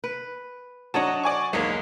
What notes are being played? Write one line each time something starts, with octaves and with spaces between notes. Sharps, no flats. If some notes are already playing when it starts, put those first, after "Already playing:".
B4
F#3 D4 C#5 D#5 F#5 A5
D5 G#5 C#6
B1 E2 G#3 A#3 C#5